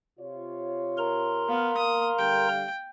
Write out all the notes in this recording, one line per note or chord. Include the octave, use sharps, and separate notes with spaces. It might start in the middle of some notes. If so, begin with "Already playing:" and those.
C3 F4 C#5
A#4 A#5 C6
B3 F5
A#3 D#6
D3 G3 G5